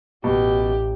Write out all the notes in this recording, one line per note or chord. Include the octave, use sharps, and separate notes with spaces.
A1 B2 G4